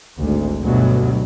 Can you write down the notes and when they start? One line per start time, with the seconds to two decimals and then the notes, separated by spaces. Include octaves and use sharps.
0.18 G#1 D2
0.62 D2 G2 B2 F#3